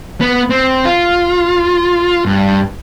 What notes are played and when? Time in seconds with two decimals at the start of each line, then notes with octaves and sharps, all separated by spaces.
0.21 B3
0.50 C4
0.85 F4
2.26 G2